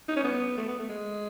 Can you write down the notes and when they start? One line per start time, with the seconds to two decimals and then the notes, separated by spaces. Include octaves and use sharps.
0.08 D#4
0.16 C#4
0.24 B3
0.57 A3
0.68 B3
0.79 A3
0.89 G#3